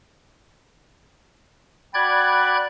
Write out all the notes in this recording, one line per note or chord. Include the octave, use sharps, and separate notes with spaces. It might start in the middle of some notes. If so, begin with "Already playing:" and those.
F#4 D5 G5 B5 F#6 G#6